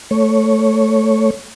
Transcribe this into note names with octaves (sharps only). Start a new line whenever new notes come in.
A3 C#5